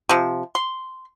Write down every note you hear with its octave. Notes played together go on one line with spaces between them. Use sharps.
C3 F3
C6